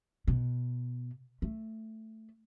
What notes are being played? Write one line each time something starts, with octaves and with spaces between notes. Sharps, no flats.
B2
A3